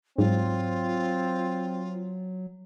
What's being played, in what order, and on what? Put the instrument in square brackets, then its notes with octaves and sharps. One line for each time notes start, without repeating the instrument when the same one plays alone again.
[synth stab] G#2 [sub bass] F#3 [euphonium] C4 [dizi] F4